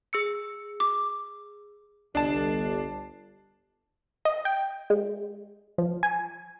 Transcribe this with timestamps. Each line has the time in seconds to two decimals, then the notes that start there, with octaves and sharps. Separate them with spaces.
0.13 G#4 E6 C#7
0.80 D6
2.15 G1 C2 D4 D#5 A5 C7
4.25 D#5
4.45 G5
4.90 G#3
5.78 F3
6.03 G#5